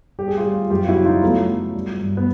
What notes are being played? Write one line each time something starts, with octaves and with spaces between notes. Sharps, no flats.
G3 G4
G#4
F4 G4
G3
F#2 F4 G4
F4
E4 F#4
C#3
D#4 F4
F#3 A3 B3
F#3
G3
G2
B3